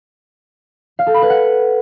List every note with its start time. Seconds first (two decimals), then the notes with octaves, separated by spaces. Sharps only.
0.99 F5
1.07 A4
1.14 B5
1.22 B4
1.30 F#5